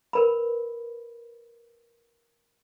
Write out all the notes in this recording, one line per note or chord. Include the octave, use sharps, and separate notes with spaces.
A#4 B4 B5